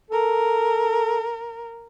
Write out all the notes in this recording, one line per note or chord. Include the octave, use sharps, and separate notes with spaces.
A4 A#4